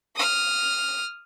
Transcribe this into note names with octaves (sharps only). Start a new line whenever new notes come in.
D#6 F6